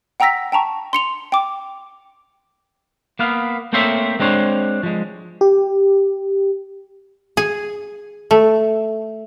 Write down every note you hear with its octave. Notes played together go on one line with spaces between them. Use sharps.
F#5 G5 A#5 E6 A#6 B6
G5 A5 A#5 C#6
C6 C#7 F7
G5 D6
A#3 B3 F5
A3 A#3 C4 C5 C#5 E5
G#3 C4 D4 C5 C#5
F3 G#3
G4
G#4
A3